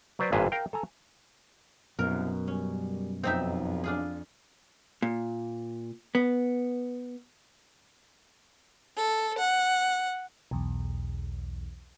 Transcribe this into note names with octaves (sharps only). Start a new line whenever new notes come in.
F#3 B4 C5 D5
G#1 G2 A#2 G#4 B4 E5
A#4 F5 G5
A4 G#5 A#5
C2 F#2 B2 A#4
G3 C#4
B1 F2 C4 D#4 E5
D4 F4 G#4
A#2
B3
A4
F#5
B1 E2